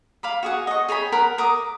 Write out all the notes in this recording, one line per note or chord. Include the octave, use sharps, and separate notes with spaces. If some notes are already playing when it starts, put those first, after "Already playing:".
F5 B5 D6
F#4 G#4 F#5
D#5 C#6
G#4 C#5 G5 B5
A#4 F#5 B5
A#4 D6 D#6